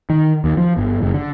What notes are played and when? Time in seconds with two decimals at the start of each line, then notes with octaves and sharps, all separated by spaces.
0.10 D#3
0.44 D#2
0.57 F3
0.77 G1
1.02 F#1
1.14 D3